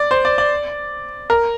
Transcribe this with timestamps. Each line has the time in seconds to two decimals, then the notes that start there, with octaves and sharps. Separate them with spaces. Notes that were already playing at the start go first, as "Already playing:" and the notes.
Already playing: D5
0.11 C5
0.25 D5
0.38 D5
1.30 A#4